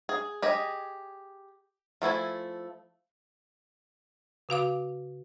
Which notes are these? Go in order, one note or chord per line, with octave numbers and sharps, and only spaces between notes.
G#4
G4 G#4 D#5
F3 A3 E4 G#5
C#3 F#4 F5 D6